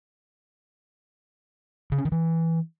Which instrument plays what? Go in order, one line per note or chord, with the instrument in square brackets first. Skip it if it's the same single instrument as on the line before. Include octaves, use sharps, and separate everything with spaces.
[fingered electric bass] C#3
C#4
D#3
E3